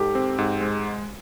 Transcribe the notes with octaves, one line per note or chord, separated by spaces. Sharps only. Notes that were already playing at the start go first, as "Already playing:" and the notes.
Already playing: G#2 G4 A4
C4
G#2
G#3